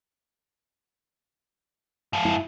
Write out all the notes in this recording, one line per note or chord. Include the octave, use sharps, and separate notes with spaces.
G#2 F3
E4